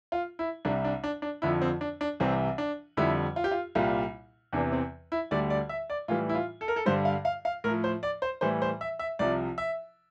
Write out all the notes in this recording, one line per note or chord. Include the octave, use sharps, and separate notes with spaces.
F4
E4
C2 C3 G3 D4
D4
D4
D4
F2 D3 F3 E4
C4
D4
D4
C2 C3 E3 G3 C4
D4
F2 D3 G3 E4
F4
G4
F4
C2 A#2 G3 F4
E2 C3 E3 D4
C4
E4
D2 D3 G3 D5
D5
E5
D5
A2 E3 G3 F4
E4
F4
A4
A#4
A4
G2 D3 G3 C5
F5
F5
F5
A2 F3 A#4
C5
D5
C5
A2 E3 G3 C5
C5
E5
E5
C2 C3 F3 D5
E5